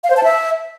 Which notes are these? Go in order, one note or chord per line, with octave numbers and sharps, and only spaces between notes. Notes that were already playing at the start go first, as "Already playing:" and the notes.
F5
C5
A5
E5